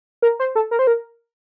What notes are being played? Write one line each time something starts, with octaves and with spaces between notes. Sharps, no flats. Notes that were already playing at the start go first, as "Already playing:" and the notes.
A#4
C5
A4
A#4
C5
A#4